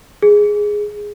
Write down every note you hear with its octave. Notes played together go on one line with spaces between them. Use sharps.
G#4